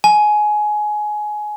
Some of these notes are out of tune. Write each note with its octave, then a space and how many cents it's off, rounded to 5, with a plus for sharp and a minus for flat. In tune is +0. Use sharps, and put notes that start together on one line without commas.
G#5 +20